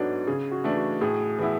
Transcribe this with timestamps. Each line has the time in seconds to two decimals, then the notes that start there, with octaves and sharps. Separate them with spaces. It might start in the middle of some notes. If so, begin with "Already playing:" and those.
Already playing: G#2 F#3 B3 D4 A4 C#5
0.27 C#3 G#4
0.51 F#4
0.64 E3 A3 D4
0.77 F#4
1.01 A2 G#4
1.39 E3 B3 E4 G#4